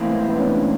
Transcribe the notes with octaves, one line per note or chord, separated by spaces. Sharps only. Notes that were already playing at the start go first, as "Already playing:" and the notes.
Already playing: A2 E3 G#3 A#3 C4
B3
B3
C#4
D4